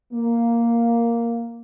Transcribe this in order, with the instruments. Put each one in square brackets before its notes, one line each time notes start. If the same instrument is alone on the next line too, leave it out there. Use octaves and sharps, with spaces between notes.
[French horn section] A#3